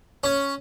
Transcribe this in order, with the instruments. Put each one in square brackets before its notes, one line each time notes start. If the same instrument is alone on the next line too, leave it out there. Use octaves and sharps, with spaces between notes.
[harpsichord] C#4